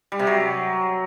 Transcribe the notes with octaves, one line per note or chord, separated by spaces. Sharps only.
G3
C3
F#3